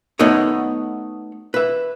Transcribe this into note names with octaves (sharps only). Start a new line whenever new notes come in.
A3 B3 D#4 F#4 C#5 D#5
B4 E5